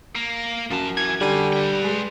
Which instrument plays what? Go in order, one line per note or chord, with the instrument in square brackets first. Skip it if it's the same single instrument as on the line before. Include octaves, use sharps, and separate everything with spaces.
[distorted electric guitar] A#3
[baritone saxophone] F#2 [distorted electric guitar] F3 A5
[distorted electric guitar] E3 [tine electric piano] G#6
[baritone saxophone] D3 [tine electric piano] G3 [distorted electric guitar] F#4 G#5
[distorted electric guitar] B4 G5
[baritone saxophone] G#3